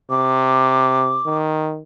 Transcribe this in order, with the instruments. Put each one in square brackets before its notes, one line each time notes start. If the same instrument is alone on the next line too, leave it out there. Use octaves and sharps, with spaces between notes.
[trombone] C3 [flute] D6
[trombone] D#3